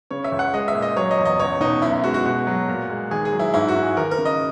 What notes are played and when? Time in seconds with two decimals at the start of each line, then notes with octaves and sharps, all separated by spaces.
0.11 C#3 C#5
0.24 E5
0.32 C#2
0.39 F#5
0.53 G#3 D#5
0.68 E5
0.75 A#2
0.82 D#5
0.96 F#3 C#5
1.11 D#5
1.18 E2
1.25 D#5
1.39 C#2 C#5
1.60 B2 D#4
1.82 F#2 E4
1.93 E4
2.04 G#3 F#4
2.14 F#4
2.25 B2 F#4
2.47 F#3
2.69 A#2
2.90 G#3
3.11 D#2 G#4
3.25 G#4
3.32 F#3
3.39 E4
3.54 G#2 E4
3.68 F#4
3.75 G#2
3.82 G#4
3.97 D#2 A#4
4.11 A#4
4.18 C#3
4.25 D#5